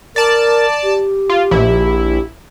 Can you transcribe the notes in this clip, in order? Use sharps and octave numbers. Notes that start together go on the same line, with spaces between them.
A#4 D5 A5
G4
F4
A#1 E4